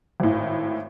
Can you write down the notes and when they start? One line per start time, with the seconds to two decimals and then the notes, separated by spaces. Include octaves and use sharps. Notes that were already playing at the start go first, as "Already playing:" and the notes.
0.20 G#1 A2